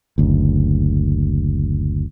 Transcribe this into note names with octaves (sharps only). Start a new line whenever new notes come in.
F#1 D2